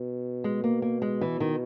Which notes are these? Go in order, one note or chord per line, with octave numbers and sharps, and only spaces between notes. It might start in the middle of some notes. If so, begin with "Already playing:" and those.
Already playing: B2
G#3
A#3
A#3
G#3
E3
D#3